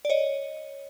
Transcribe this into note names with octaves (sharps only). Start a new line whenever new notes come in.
D5
C#5 D#5